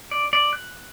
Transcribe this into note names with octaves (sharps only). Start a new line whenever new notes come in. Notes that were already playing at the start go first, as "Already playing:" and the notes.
D5
D5
F#6